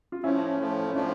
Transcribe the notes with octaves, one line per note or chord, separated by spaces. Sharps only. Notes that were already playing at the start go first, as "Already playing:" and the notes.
F4
A2 F3 A3 C#4 E4
A2 F3 A3
C#4
A2 F3 A3 D4